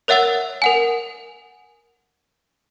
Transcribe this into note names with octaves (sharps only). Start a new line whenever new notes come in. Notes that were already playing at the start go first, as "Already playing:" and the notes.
A#4 C#5 E5 F#5 E6 A6
A#4 F#5 G#5